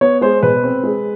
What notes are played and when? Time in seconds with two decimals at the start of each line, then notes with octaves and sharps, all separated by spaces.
0.01 B3 C#5
0.21 G#3 C5
0.43 B2 B4
0.63 C4
0.83 G#3